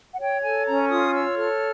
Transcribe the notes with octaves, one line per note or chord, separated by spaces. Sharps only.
F#5
C#5 G5
A4 G#5
C#4 A#5
F4 D#6
C#5 E6
A4 F6